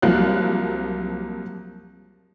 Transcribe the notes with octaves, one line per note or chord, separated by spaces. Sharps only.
C2 F3 F#3 A#3 F5 F#6